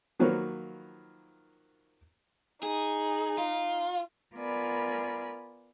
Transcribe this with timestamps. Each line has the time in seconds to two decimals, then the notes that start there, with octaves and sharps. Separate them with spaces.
0.19 D#3 F3 F#3 A#3 B4 C#5
2.63 D#4 G#4
3.38 F4
4.34 B3 F4 A#4 D5 G#5 B5